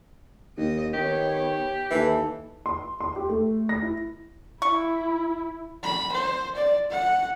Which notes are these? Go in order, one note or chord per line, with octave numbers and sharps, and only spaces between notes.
D#2 D#5
D#3 B3 G4 C#5
D#2 E3 A4
C6
C6
G4
A3
A#6
E4
E4 C#6
B5
C5
D5
F#5